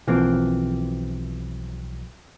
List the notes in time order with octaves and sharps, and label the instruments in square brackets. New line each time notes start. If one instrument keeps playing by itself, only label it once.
[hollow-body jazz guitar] B1 E3 F3 A#3 C4